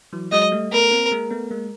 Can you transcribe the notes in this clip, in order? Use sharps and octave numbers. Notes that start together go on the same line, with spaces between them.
E3 F#3
F#3 G#3 D#5
G3 A3
A3 B3 A#4
A#3 C4
G#3 A#3
A3 B3
G#3 A#3